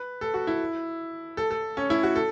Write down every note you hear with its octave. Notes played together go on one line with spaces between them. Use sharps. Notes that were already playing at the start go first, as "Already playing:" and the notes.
Already playing: B4
A4
F#4
E4
A4
A4
C#4
E4
F#4
A4